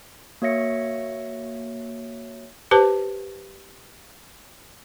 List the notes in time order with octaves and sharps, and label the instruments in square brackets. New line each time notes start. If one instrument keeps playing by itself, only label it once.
[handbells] A#3 F#4 C#5 E5 A#6 C#7
[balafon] G4 B4 C5 A5